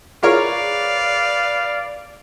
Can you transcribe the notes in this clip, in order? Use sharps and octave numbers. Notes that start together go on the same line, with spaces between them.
F4 G#4 A#4 B4 C#5 D5 F5